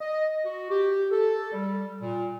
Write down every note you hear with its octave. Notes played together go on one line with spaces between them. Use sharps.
D#5
F#4
G4
A4
G3
A#2